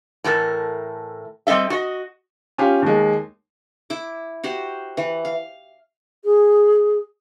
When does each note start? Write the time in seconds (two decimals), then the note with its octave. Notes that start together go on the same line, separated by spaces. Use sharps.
0.24 A2 E3 A4 A#4
1.47 G3 C4 A4 D#5 E5
1.70 F#4 D#5
2.58 C#4 F4 G4
2.82 D#2 G#3
3.90 E4 D6
4.44 F#4 G4 C5
4.97 E3
5.25 F5
6.24 G#4